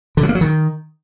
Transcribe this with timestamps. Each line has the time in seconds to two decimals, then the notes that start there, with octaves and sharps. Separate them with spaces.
0.17 D3
0.23 F#3
0.29 A#3
0.35 F#3
0.41 D#3